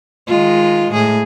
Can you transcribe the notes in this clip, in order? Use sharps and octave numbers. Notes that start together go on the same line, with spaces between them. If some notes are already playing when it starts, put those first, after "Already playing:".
D#3 G#3 F4
A2 G#4